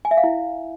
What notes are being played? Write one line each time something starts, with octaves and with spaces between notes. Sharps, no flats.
G#5
E5
F5
E4